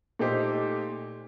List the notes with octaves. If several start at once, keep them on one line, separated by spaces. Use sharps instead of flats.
A#2 A3 D#4 G4 C5